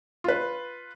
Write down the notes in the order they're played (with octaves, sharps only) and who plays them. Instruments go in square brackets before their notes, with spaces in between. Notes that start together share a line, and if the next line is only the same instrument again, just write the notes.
[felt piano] F4 B4